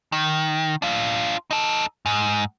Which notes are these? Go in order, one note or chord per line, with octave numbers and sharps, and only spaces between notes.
D#3
D4 F4
D#4 A4
G#2